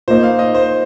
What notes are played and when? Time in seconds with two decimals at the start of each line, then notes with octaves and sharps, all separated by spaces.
0.08 A#2 A#3 D#4 C5
0.23 F5
0.39 D#5
0.55 C5